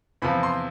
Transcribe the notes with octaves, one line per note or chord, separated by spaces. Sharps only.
E2 C3 F3 B5
C6